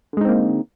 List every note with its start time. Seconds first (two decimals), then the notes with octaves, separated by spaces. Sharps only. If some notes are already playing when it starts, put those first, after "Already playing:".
0.13 D3
0.17 G#3
0.21 D#4
0.25 C4
0.29 A#3